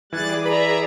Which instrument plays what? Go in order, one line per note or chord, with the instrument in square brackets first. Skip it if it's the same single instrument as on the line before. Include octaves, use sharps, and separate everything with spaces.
[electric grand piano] E3 G#6 [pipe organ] G3 F#6 A6 [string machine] G#4 D5
[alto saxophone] B4 [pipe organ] E5 A#5